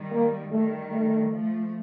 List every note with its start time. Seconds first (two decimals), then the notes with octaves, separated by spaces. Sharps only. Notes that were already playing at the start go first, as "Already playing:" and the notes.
Already playing: D#3 G3
0.11 A#3
0.51 D#3 G3 A3
0.91 A3
1.32 F3 A3